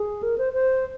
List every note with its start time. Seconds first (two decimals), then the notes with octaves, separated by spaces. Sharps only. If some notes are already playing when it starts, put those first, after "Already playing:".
Already playing: G#4
0.23 A#4
0.38 C5
0.53 C5